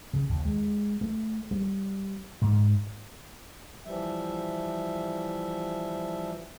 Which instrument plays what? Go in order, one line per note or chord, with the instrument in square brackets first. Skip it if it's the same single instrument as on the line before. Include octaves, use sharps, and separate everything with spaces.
[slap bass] C#3
D#2
G#3
A3
G3
G#2
[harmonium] E3 F3 G3 E5